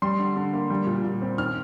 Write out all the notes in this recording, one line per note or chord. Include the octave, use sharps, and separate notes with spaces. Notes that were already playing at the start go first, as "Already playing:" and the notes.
G3 C6
D3
D3
A#3
G3
A#2
A#2
C4
D#3 F6